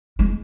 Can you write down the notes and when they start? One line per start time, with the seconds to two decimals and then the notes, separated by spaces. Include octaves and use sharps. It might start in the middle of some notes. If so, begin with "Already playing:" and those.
0.19 G#3